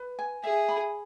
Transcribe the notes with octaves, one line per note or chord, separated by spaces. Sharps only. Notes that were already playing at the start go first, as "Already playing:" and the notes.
Already playing: B4
G#5
G#4 E5
B5